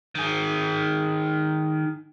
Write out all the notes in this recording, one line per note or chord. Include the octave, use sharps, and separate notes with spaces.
D#3 G#4